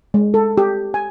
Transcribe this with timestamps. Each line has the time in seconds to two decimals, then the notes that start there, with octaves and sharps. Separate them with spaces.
0.14 G#3
0.34 A4
0.58 G4
0.94 G#5